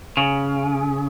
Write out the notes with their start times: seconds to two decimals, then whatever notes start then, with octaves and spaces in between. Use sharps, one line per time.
0.17 C#3